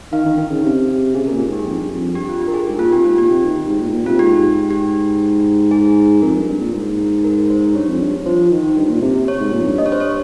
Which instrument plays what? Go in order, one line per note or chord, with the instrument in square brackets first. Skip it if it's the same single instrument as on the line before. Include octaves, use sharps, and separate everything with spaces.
[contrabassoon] D#3 [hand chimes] F5
[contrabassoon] D#3
D#3
C#3
C3
[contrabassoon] C#3 [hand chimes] G#4
[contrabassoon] A#2 [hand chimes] A#4
[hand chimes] G#4
[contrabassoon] G#2 [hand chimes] G4
[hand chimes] G#4
[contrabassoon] F2 [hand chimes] G4
[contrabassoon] G2
F2
[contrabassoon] G2 [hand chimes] G4
[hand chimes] F4
G4
A#4
G#4
[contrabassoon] G#2 [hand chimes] G4
[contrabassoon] A#2 [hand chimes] F4
[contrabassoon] C3 [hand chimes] G4
[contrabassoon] G#2 [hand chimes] F4
[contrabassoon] A#2 [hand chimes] G4
[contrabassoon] C3
D#3
G#2
A#2
G#2
A#2
[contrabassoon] C3 [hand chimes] F4
[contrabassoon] G#2 [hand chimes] G4
[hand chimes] G4
G#4
[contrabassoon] F2 [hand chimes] A#4
[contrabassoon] G2
G2
A#2
G#2
[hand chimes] A#4
C5
[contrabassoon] G2 [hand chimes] C#5
[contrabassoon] F2
G2
[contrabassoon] F3 [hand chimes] C5
[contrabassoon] D#3
G2
A#2
C3
C3
[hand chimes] C#5
[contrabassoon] G#2
A#2
F2
G2
[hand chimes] D#5
C#5
C5
C#5